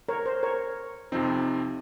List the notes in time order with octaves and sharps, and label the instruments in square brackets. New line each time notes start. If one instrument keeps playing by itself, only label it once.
[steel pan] A#4 C#5
C5
A#4 C#5
[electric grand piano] F2 C3 F3 C4 D#4